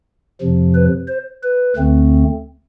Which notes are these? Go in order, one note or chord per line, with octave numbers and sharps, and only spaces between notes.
F2 C3 F3
B4
C5
B4
D2 D3 A3 C4